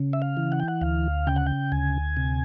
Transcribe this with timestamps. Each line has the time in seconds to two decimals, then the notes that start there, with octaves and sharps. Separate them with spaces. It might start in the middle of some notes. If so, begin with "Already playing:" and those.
Already playing: C#3
0.13 E5
0.22 F5
0.37 E3
0.52 F#5
0.60 G5
0.68 F#5
0.81 D2 F5
1.27 C#3 G5
1.36 F#5
1.47 G5
1.72 D2 G#5
2.17 C3